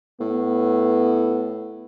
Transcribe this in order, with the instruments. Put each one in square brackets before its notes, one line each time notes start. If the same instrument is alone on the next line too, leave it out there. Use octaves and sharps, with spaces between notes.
[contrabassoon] A2 [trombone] B3